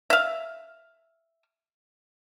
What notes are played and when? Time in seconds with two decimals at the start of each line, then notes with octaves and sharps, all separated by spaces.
0.10 E5 F5